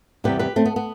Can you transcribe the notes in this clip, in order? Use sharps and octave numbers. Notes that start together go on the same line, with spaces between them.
E2 C3 E3 G3 G4 B4
G4 B4
A3 C4
B3
B3